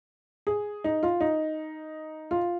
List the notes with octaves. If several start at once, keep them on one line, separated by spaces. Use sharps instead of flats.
G#4
D#4
F4
D#4
F4